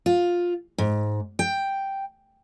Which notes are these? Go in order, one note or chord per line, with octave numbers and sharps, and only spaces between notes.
F4
G#2
G5